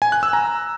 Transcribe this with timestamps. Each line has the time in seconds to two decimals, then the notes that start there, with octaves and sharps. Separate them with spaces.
0.02 G#5
0.12 F#6
0.23 E6
0.33 A#5